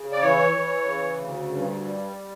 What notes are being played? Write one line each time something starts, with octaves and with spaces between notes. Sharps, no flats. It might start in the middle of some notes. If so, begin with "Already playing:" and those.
Already playing: C#3
D5
E3 C#5
E3
C#3
D2
G2
G3